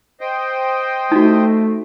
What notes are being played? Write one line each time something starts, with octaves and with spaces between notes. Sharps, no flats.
C5 D#5 G5
A3 D#4 F#4